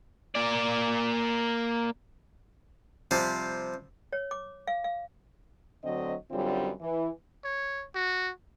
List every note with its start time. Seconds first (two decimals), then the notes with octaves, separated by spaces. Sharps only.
0.35 A#3 D5
3.11 C3 F3 G3
4.13 C#5
4.31 D6
4.67 F5
4.84 F5
5.83 D2 D3 F#3 C4 D#5
6.31 F#2 D3 G3 C4 C#4 F4
6.81 E3
7.45 C#5
7.95 F#4